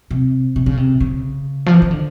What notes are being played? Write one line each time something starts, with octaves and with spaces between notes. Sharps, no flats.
C3
C3
C#3
C3
C#3
F3
E3
D#3
D3